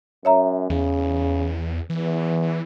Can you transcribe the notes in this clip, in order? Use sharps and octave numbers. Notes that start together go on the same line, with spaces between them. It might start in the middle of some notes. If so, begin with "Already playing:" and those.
F#2 C#5 E5 A#5
E2 C#3
E2 E3